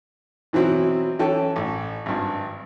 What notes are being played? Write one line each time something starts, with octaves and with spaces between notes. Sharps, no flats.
B2 E3 F#3 C4 E4
E3 C#4 A4 G5
A1
G#1 G2